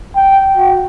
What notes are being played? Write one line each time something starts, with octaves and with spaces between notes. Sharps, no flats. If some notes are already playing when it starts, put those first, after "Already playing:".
G5
F#4